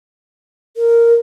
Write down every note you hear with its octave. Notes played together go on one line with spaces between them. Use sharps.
A#4